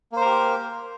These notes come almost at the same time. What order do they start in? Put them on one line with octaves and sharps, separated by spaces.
A#3 C5 A#4 G4